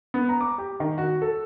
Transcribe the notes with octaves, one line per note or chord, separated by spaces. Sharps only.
B3
A#5
D6
G4
D#3
F#4
A4